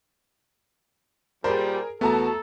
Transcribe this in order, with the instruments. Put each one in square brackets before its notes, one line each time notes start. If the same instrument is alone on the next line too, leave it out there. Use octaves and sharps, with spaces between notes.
[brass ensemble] A#2 G3 [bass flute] G4 [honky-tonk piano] G#4 A#4 [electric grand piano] C5 D5 B5
[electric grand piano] E2 B3 [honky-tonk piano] A3 A5 A#5 [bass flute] F#4 [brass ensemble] A4